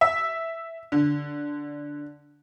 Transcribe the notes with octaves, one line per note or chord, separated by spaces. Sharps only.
E5
D3